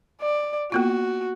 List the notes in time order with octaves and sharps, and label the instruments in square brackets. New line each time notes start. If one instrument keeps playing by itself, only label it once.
[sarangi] D5
[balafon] A#3 B3 F4 [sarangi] F#4